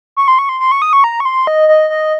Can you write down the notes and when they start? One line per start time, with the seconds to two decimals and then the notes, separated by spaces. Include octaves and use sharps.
0.17 C#6
0.28 C6
0.39 C#6
0.49 C6
0.60 C6
0.72 C#6
0.82 D#6
0.93 C#6
1.04 A#5
1.20 C#6
1.25 C6
1.47 D#5
1.68 D#5
1.90 D#5